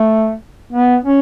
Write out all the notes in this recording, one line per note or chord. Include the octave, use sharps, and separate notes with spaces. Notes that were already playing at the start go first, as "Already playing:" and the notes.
Already playing: A3
B3
C#4